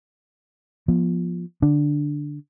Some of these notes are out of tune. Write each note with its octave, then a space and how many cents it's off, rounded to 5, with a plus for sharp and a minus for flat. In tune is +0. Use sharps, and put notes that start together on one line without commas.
F3 +0 B3 -30
D3 +0 D4 +0